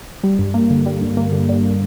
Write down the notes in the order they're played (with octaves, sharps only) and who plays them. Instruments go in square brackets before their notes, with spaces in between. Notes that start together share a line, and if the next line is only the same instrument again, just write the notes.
[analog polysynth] G3
G2
A#3
D3
G3
G2
A#3
D3
G3